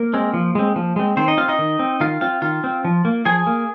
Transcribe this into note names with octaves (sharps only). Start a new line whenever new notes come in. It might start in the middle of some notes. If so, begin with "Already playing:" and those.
Already playing: A#3 A#4
G#3 C4
F3
G#3 C4
F3
G#3 C4
D#3 C4 C5
D#4 D#5
C4 F4 F5
D#4 D#5
D#3
C4
D#3 F4 F5
C4 F4 F5
D#3 F4 F5
C4
F3
A#3
F3 G#4 G#5
A#3